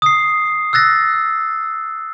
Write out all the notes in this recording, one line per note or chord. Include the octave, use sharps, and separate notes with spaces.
D#6 C7
E6 F#6 A6 A#6